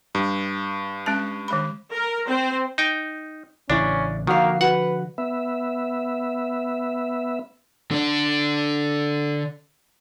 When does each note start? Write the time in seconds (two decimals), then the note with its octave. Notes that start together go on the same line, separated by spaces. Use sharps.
0.15 G2
1.06 G#3 C#4 A5
1.48 D#3 G#3 B5
1.93 A#4
2.28 C4 C5
2.78 D#4 G5
3.70 A1 C#3 E3 C#4 D4 E4 D5
4.27 D3 D#3 F3 A#3 F#4 F5
4.61 F#4 B4 F#5
5.18 B3 E5
7.91 D3 D4